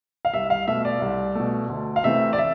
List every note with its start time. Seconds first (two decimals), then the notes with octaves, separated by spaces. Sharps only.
0.25 F5
0.34 C2 E5
0.50 F5
0.67 B2 A3 E5
0.85 D5
1.01 C2
1.35 B2 A3
1.70 D2
1.96 F5
2.04 C3 E3 A3 C4 E5
2.33 D5
2.38 E5